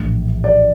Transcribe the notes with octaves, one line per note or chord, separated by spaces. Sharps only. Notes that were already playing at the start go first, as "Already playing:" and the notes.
Already playing: A#1 A2 E3
D5